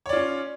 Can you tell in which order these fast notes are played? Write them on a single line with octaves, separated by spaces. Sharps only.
C#5 D5 F4 C#4